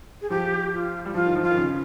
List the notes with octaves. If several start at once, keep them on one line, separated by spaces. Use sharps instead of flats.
G#4
F3 G4
F4
G3
F3 F4
D#3
F3
F4
D#3
C#3